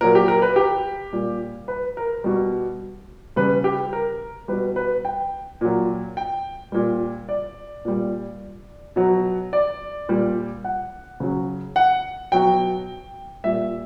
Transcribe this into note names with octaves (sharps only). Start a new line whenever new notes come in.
A#2 F#3 A#4
G4
A#4
B4
G4
A#2 G3
B4
A#4
B2 G3
C#3 G3 B4
G4
A#4
B2 G3 B4
B4
G5
A#2 F#3
G5
A#2 G3
D5
A#2 G3
B2 F#3
D5
A#2 G3
F#5
C#3 F#3
F#5
B2 F#3 G5
A#2 G3 E5